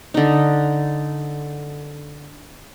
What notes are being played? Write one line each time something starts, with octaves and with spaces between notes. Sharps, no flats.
D3 D#4